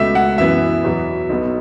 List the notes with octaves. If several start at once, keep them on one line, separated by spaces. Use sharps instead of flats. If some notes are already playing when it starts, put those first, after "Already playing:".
Already playing: C#2 B2 A3 E5
F#5
F#2 E3 B3 E5
E2 B2 F#3
B1 B2 B3